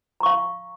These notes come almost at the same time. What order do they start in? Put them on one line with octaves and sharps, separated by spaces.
A#5 C#6 F5